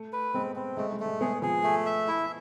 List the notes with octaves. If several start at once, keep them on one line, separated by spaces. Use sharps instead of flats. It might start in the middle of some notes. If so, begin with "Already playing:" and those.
Already playing: A3
B4
G#3 B3 C4
C4
G#3 A3
G#3
A3
G#3
G#3 B3 G#4
F3 G#4
A3
E5
E4